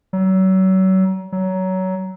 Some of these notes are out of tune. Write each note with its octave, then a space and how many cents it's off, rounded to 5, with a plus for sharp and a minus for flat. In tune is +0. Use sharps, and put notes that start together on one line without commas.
F#3 +35
F#3 +20